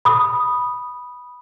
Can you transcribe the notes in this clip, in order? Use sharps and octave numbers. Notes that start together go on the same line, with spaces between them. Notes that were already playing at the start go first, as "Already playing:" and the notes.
B5 D#6